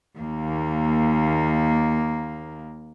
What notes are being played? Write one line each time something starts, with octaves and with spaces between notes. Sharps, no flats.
D#2 A#3